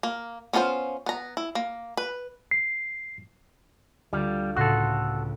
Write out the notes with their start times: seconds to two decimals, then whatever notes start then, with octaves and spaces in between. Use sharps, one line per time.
0.03 A#3
0.53 B3 C#4 F4 G#4 C5
1.06 B3 A#5
1.37 E4
1.55 A#3
1.97 B4
2.51 C7
4.13 D2 G3 F4
4.56 C#2 A2 F#4 A4 C6